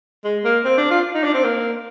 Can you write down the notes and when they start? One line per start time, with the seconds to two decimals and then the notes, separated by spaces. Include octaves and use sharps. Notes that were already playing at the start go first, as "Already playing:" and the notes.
0.24 G#3
0.45 A#3
0.65 C4
0.78 D4
0.91 F4
1.14 D#4
1.24 D4
1.34 C4
1.44 A#3